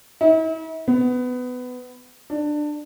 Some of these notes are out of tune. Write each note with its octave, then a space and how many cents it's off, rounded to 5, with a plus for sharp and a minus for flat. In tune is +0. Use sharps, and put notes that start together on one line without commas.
E4 -45
B3 +20
D4 +20